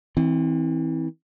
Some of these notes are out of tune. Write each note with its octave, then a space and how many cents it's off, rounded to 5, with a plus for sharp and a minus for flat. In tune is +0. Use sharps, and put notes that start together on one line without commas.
E3 -30 C4 +0